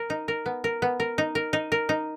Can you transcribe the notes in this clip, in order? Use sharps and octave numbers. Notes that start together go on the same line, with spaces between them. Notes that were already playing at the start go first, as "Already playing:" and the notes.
Already playing: A#4
D#4
A#4
B3
A#4
B3
A#4
D#4
A#4
D#4
A#4
D#4